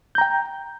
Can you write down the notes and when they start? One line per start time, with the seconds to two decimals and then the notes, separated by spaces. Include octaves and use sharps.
0.15 G6
0.18 A#5
0.21 G5